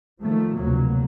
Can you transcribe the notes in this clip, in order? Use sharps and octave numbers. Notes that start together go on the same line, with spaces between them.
D#3 F3 A3
F1 D2 B2 F#3 A#3